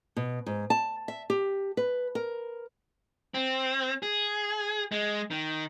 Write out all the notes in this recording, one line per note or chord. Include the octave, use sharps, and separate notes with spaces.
B2
G#2
A5
E5
G4
B4
A#4
C4
G#4
G#3
D#3